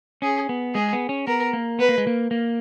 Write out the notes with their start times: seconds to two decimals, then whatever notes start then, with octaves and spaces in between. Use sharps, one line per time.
0.22 C#4 G#4
0.49 B3
0.74 G#3 G#4
0.93 B3
1.09 C#4
1.27 B3 A#4
1.53 A#3
1.79 B3 B4
1.89 A#3
1.98 G#3
2.07 A#3
2.31 A#3